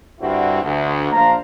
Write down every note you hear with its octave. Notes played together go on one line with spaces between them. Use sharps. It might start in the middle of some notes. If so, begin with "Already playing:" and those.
G2 D3 G3 C4 E4 F#4
D2
A#1 D4 C5 F5 A#5